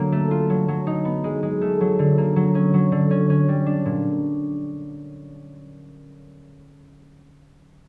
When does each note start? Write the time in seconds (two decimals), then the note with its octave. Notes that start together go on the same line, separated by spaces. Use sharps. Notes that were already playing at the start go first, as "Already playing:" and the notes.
Already playing: D3 F#3 A#3
0.12 A3
0.31 F4
0.50 F#3
0.68 F#3
0.87 D#4
1.05 B3
1.24 G#3
1.43 G#3
1.61 A3
1.81 F#3
1.99 D3
2.18 A#3
2.36 F#3
2.55 C#4
2.74 F#3
2.92 D3
3.11 C#4
3.30 C#4
3.48 G3
3.66 D4
3.85 A#2